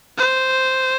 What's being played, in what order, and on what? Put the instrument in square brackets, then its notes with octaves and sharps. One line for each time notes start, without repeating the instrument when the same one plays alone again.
[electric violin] C5